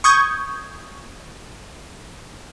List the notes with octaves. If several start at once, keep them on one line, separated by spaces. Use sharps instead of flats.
C#6 D#6 G6 G#6